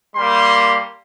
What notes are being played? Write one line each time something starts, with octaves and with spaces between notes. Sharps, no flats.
G3 A#3 C6